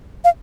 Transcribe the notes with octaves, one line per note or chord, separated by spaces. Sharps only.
F5